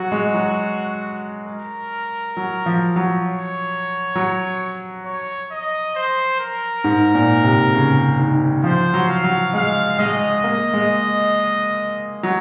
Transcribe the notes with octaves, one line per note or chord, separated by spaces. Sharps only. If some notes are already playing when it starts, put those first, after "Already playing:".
Already playing: F#3 F#4
G#3
F#3
A#4
F#3
F3
F#3
C#5
F#3
C#5
D#5
C5
A#4
G#2
A#2
C3
C#3
D#3
F3 C5
F#3
F5
F#3
G#3 F5
G#3 D#5
A#3
G#3
F#3